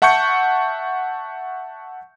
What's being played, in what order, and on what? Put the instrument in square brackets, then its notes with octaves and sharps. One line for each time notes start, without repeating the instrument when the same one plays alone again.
[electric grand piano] E5 F#5 A5 C#6 G6 C#7